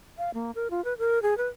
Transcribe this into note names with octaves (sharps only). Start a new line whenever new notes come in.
F5
A#3
A#4
F4
B4
A#4
G#4
B4